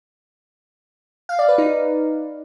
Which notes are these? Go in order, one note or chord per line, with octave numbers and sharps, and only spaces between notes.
F5
D5
B4
D#4